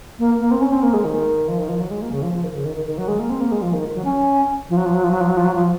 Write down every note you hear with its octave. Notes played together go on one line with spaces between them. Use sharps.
A#3
A#3
C4
C#4
C4
A#3
G#3
D#3
F3
D#3
F3
F#3
G#3
A#3
C#3
F3
F3
D#3
C#3
D#3
D#3
D#3
F#3
G#3
A#3
C4
A#3
G#3
F3
D#3
F#3
C#4
F3
F#3
F3
F#3
F3
F#3
F3
F#3
F3
F#3
F3